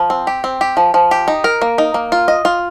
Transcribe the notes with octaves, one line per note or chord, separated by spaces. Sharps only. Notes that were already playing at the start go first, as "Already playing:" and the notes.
Already playing: F3
C4
G4
C4
G4
F3
F3
G4
D#4
A#4
A#3
D#4
A#3
F4
D#5
F4